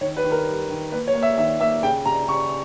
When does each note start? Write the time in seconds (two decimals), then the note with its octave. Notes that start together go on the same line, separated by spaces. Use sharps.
0.01 D#3 C#5
0.17 B4
0.24 D#3
0.32 A#4
0.47 G3
0.70 D#3
0.92 A#3 B4
1.07 C#5
1.15 A#3
1.23 E5
1.38 D#3 E5
1.60 A#3 E5
1.83 C#3 G5
2.06 C#3 A#5
2.28 C#3 C#6